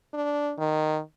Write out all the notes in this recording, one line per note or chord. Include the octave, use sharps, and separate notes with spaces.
D4
D#3